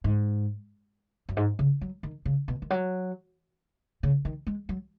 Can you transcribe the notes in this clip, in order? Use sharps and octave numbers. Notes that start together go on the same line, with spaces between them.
G#2
F#2
G#2
C#3
F#3
D#3
C#3
B2
D#3
F#3
C#3
D#3
G#3
F#3